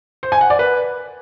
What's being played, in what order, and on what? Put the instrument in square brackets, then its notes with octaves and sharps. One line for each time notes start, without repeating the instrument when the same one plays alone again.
[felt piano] C5
G#5
F#5
D5
B4